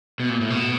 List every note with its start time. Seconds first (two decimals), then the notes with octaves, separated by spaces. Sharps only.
0.20 B2
0.29 A#2
0.41 A2
0.50 B2